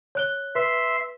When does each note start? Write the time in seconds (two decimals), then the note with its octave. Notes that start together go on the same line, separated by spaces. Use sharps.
0.15 C#5 F#6 G7
0.55 B4 E5 C6